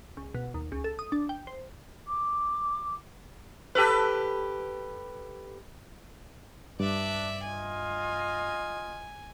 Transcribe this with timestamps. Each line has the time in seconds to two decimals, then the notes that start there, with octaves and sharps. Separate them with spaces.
0.17 C#2
0.35 B2
0.54 D#2
0.72 C#2
0.84 A4
0.99 D#6
1.12 D4
1.29 G5
1.47 C5
2.07 D6
3.75 G4 A4 B4
6.80 G2 D4 D5 E5
7.44 F4 D#5 G#5